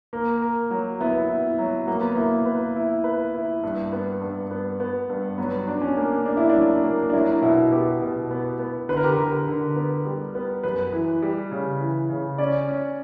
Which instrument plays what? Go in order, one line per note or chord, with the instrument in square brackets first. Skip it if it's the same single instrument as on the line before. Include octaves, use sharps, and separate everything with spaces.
[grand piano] A#3 [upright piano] A#4
[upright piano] A#4
F#3
[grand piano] B3 [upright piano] E4
[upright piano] E4
F#3
[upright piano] F#3 [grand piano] A#3
[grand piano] B3
[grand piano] A#3 [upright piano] E4
[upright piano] B4
E4
B4
E4
G2
B3
G2
B3
B3
G2
[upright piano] F#3 [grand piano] B3
[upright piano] D4
[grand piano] C#4
[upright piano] A#3
[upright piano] A#3 [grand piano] D4
[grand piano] E4
D4
[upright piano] F#3
A#3
[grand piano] D4
[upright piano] F#3 [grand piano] E4
[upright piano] B2 [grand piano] E4
[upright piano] B3 [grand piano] G4
[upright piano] B2
B3
B3
[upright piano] D3 [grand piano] B4
[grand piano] A#4
G4
A#4
[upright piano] D3
D3
B3
G3
B3
[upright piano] F#2 [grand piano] B4
[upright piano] E3
G3
C#3
E3
C#3
[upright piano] C#4 [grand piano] D5
[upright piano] C#4